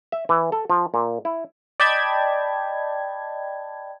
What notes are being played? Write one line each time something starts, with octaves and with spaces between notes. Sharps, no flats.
E5
E3
A4
F3
A#2
E4
D5 D#5 G5 A5 B5 G#6